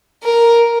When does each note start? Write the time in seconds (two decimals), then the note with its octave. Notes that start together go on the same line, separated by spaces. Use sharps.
0.24 A#4